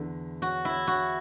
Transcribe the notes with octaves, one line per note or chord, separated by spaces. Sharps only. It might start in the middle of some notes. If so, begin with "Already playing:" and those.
Already playing: E2 D3
F#4
E4
F#4